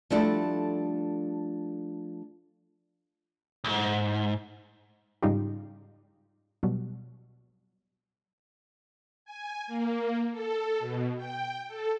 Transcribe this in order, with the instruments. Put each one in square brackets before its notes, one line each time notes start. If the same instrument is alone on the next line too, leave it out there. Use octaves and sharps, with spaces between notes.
[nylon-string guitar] F3 G3 A3 D4 E4 A4
[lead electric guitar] C2 G#2
[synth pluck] G#2 C#3 G3 D#4 F4 G4
B2 F#3 G3
[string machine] G#5
A#3
A4
B2
G5
A4